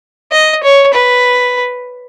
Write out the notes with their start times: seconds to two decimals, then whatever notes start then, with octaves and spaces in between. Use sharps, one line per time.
0.32 D#5
0.64 C#5
0.94 B4